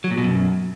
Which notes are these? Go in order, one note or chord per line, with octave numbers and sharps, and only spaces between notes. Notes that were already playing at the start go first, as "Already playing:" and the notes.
F#3
A#2
B2
F#2